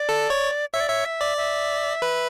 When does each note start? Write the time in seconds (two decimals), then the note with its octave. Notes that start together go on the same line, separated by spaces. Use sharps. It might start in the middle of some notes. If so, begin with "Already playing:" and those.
Already playing: D5
0.09 A4
0.30 C#5
0.73 C#5 E5
0.80 D5
0.89 C#5 E5
1.05 E5
1.21 D5
1.37 E5
2.02 B4